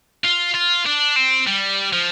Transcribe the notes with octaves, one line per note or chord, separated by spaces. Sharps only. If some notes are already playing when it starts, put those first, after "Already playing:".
F4
F4
D4
C4
G3
F3